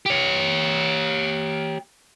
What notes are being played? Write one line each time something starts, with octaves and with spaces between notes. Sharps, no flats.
G4 C#5